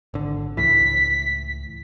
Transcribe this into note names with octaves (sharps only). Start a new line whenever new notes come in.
G#1 D3
C#2 A2 E3 B6